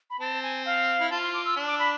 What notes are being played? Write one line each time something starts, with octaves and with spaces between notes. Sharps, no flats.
B5
C4 A5
G#5
F5
E4
F4 A5
C6
D6
E6
D4
D6
B5